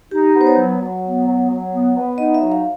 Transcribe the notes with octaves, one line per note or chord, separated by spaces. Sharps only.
D#4 G4
B3
C5
C#5
F#3
F#3
B3
F#3
F#3
B3
B3
D#4 D#5
E5
F#3
F5